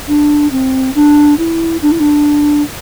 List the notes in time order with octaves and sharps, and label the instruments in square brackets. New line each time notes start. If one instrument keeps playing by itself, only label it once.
[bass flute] D4
C4
D4
E4
D4
E4
D4